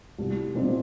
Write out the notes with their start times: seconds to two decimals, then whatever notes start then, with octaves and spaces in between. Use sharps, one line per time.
0.18 C2
0.54 A#2 G3 C4 D#4